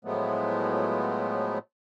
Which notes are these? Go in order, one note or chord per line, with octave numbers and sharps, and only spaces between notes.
A2 F3 F#3 G#3 A3 B3